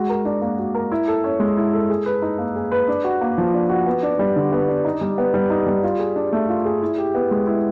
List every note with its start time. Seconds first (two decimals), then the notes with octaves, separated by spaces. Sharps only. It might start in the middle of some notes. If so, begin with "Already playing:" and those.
Already playing: G#3 F#4
0.09 A#4
0.25 D4
0.42 A#3
0.58 F#4
0.74 A#4
0.92 E4
1.08 A4
1.24 C#4
1.40 G#3
1.57 E4
1.73 A4
1.90 G#4
2.06 B4
2.22 D#4
2.38 A#3
2.56 G#4
2.72 B4
2.88 D4
3.04 F#4
3.21 A#3
3.38 F3
3.53 D4
3.69 F#4
3.86 B3
4.03 D4
4.19 G3
4.36 D3
4.52 B3
4.68 D4
4.85 D#4
5.01 G3
5.18 B3
5.34 G3
5.50 D#4
5.67 G3
5.83 F4
5.99 G#4
6.16 D4
6.33 A3
6.49 F4
6.65 G#4
6.82 E4
6.98 G4
7.15 B3
7.31 G#3
7.47 E4